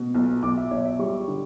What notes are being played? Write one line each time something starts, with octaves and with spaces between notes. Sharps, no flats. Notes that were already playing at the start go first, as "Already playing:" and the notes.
Already playing: B2
B1
B1 D6
E5
B1 C#5
E5
G3 C#6
D3